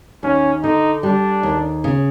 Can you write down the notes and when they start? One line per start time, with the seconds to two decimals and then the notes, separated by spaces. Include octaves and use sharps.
0.23 D#2 C#4
0.63 D3 D#4
1.03 G3 D4
1.43 D#2
1.84 C#3